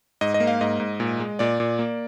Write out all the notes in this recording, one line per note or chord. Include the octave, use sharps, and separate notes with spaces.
G#2 D#5
D#5
A#3
F5
G#2 D#5
G#2
A#2
G#3
A#2 D5
A#2
A#3